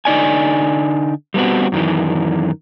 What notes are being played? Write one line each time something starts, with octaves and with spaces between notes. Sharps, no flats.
D3 D#4 D5 G#5
G3 A3 B3 C4 F#4
F#2 D#3 E3